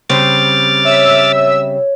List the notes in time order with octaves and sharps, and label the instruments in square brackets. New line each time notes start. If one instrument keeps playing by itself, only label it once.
[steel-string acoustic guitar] C#3 G3 C4 [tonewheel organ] D6 F6 A6
[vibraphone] C#5 [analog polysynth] E5 E6